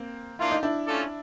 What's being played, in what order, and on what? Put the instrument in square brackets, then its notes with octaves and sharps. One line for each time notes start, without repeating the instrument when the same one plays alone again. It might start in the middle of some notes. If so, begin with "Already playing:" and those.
Already playing: [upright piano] A#3 C4
[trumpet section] A#3 D4 F4 [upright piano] E4
[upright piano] D#4
D4 E4
[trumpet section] A3 C#4 F4 A4 D5